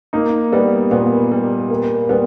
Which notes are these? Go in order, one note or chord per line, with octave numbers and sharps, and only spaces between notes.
A#3 D#4
G3 B3
A#2 B3
G3
A#3
G3 B3